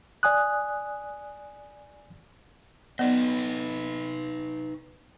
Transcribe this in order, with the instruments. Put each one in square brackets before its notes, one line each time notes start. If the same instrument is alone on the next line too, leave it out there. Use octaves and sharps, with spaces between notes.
[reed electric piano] D5 G#5 D#6 F#6
[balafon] B3 D5 [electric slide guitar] D#4 B4 D#5